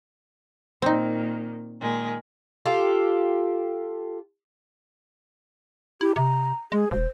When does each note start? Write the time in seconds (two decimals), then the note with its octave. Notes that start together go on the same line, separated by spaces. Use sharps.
0.82 A#2 D#3 C4 D#4
1.79 A#2 D#3 G#3
2.66 F4 G4 A4
6.01 E4 G4
6.16 C3 A#5
6.72 G#3 G#4
6.91 E1 C5